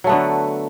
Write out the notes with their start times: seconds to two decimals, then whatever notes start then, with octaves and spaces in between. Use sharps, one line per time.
0.04 F#3
0.07 A3
0.09 B3
0.12 D3